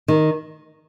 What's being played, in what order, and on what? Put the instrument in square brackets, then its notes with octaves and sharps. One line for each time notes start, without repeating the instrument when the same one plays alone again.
[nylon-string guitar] D#3